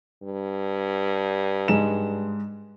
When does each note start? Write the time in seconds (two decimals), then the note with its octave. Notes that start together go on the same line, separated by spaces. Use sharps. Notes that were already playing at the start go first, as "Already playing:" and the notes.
0.22 G2
1.68 G#2 G#3 E7